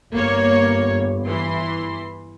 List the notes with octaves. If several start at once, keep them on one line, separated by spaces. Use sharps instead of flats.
G1 A#3 C#5
E3 C6